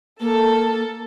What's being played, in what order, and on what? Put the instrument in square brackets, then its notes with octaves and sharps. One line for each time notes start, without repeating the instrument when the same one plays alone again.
[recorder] A#3 [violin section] A4